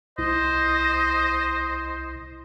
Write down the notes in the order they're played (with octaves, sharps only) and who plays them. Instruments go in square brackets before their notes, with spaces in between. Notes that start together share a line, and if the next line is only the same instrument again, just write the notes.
[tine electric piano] C2 E4 [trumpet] C5 [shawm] D#5